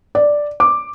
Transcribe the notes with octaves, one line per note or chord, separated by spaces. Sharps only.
D5
D6